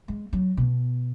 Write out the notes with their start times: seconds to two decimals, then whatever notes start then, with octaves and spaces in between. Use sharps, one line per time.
0.08 G#3
0.33 F#3
0.57 B2